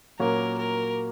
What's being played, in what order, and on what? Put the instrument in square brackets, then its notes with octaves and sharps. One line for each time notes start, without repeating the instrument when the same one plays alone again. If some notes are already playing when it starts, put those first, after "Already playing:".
[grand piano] A#2 F#3 A#3 C#4 [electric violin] A#4
[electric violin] A#4